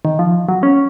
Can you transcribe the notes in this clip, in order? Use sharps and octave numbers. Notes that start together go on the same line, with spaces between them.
D#3
F3
F#3
C#4